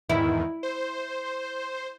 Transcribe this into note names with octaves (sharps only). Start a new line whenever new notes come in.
E2 G#2 D#3 E4
C5